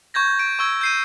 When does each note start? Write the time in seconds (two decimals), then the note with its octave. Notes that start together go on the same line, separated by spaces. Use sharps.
0.14 C#6 G6 G#6 A#6
0.39 D7
0.59 C#6 E6 G#6
0.81 G6 C7 D#7